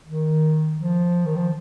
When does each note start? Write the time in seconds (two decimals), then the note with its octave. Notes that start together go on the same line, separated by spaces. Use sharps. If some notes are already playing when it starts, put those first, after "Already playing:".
0.07 D#3
0.77 F3
1.26 D#3
1.36 F3